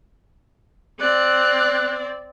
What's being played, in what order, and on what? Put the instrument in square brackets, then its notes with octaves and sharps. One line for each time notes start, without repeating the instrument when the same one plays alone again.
[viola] C4 D5 [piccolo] F#6